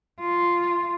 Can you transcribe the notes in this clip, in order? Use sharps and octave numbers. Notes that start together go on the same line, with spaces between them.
F4